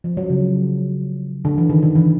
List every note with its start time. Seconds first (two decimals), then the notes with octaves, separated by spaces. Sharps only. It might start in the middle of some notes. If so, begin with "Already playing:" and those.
0.04 F3
0.17 F#3
0.30 C#3
1.45 D3
1.58 E3
1.69 D#3
1.83 D3
1.96 E3